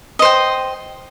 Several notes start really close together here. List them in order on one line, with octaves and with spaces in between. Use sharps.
D#5 C5 G5